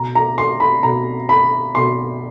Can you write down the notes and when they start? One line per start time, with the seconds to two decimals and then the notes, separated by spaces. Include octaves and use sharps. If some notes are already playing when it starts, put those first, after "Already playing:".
Already playing: B2 A#5
0.15 A#5
0.38 C6
0.60 B5
0.83 B2 A#5
1.29 B5
1.75 B2 C6